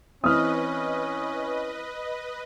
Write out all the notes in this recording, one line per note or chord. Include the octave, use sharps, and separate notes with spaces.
E3 C4 C#4 B4 D#5 D#6 F6